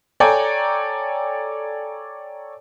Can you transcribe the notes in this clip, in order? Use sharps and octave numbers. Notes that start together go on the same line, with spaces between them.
A4 C#5 D5 G5 G#5 A#5